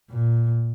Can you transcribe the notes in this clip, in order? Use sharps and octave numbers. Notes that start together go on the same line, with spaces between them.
A#2